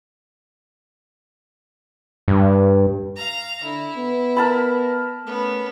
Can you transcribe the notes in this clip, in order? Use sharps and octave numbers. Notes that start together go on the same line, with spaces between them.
G2
F5 A#5
D3 E4
B3
A#4 A5 B5
A3 B3 C#4